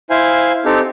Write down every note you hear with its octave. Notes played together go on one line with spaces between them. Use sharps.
E4 C5 F5 G#5
C4 D#4 G4 A4